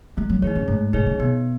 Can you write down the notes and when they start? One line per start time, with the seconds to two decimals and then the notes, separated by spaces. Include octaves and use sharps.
0.17 G#3 A3
0.30 F#3
0.42 E3 D#4 G#4 C#5
0.55 F#2
0.68 G#2 A3
0.93 B2 D#4 G#4 C#5
1.06 C#3
1.19 B2 B3